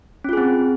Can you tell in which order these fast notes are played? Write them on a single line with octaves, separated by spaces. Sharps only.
C#4 F4 G#4 C4